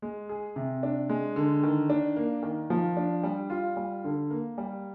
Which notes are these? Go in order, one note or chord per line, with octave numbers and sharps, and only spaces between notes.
G#3
G#4
C3
D4
G#3
D3
D#3
D4
A#3
D#3
F3
D4
G3
F4
G3
D3
A#3
G3